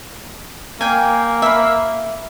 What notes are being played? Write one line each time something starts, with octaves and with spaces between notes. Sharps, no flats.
A#3 G5 G#5
E5 B5